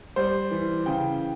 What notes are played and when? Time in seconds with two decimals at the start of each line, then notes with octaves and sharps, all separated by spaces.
0.16 G3 C5
0.51 E3
0.86 C#3 G5